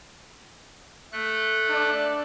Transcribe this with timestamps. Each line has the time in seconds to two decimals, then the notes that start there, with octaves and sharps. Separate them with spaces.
1.12 A3 A4 F#6
1.70 D4 D5